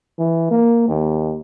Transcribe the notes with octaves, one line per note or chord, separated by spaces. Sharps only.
E3
A#3
D#2